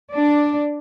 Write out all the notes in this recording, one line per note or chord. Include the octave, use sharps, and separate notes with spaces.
D4 D5